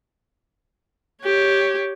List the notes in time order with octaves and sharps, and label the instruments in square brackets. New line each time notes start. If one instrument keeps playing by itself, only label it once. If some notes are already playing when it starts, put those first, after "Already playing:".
[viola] G4 C#5